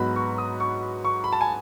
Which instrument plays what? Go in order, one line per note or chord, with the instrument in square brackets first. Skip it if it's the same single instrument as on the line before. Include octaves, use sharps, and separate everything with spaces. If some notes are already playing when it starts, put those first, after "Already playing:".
Already playing: [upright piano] G#2 F#3 B3 F#4 B4 [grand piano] B5
[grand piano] C#6
D#6
C#6
C#6
B5
A5
G#5